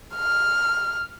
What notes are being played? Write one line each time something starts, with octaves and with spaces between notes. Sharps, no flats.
F6